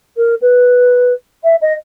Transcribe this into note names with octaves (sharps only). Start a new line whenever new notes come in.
A#4
B4
E5
D#5